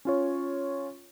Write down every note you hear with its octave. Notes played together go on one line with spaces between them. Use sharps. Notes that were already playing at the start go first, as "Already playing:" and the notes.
C#4 F4 C#5